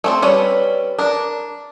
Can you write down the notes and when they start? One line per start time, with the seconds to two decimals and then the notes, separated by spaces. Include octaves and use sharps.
0.04 A3 C4 A4
0.22 G3 C#4 B4
0.99 D4 A#4